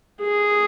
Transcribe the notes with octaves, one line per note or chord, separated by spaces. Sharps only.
G#4